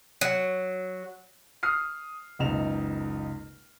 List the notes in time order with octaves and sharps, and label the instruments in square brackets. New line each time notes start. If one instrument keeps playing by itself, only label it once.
[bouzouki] F#3
[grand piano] D#6 F6 C7
F#1 C#2 D#4 E7 F7